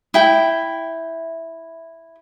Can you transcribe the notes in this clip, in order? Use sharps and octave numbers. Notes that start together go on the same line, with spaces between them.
E4 G5